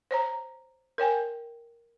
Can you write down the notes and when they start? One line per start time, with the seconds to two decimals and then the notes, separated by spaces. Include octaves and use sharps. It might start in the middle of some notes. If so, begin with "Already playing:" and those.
0.11 C5 C#5 A#5
0.98 A#4 C#5 G5 G#5